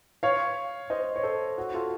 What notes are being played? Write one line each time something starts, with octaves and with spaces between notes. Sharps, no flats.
C#5 F5
C5 D#5
C#5
A4 C5
F#4
F4 A4